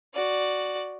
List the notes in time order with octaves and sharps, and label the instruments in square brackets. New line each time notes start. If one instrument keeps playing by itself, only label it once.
[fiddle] F#4 D5